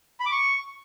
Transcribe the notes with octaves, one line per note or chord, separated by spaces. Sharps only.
B5
D6
C#6